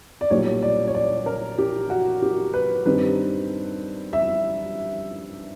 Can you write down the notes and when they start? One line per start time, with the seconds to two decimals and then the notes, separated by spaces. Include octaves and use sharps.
0.21 D5
0.30 B1 A#2 G3 A#3 C#5
0.63 D5
0.87 C#5
0.95 D5
1.26 A#4
1.58 G4
1.90 F#4
2.22 G4
2.54 B4
2.85 G2 D#3 G3 C4 B4
4.13 E5